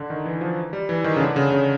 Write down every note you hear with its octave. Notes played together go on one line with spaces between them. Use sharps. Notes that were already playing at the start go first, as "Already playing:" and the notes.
Already playing: D3
D#3
E3
F3
G3
E3
D#3
C#3
D3
C#3
C#3